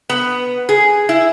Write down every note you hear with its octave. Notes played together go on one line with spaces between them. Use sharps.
B3
G#4
E4